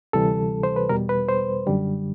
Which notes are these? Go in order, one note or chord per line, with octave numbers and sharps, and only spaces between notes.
D2 C3 E3 G3 A4
C5
B4
E2 B2 G3 A#4
B4
C5
F#2 D3 G3